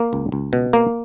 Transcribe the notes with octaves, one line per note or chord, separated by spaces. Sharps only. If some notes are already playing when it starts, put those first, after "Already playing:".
Already playing: A#3
C#2
C#2
B2
A#3